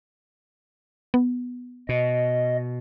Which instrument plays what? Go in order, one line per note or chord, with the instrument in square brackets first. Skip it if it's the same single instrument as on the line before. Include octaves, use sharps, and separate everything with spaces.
[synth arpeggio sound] B3
[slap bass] B2 [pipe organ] D#5